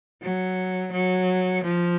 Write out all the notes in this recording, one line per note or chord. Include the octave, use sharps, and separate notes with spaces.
F#3
F#3
F3